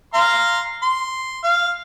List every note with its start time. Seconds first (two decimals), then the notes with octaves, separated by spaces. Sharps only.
0.14 F5 A#5 C6
0.82 C6
1.44 F5